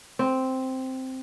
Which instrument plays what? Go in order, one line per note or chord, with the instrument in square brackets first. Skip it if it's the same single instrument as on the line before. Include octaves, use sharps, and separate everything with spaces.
[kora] C4